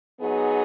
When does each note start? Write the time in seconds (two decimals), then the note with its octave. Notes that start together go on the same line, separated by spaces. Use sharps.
0.20 F#3 B3 D#4 G#4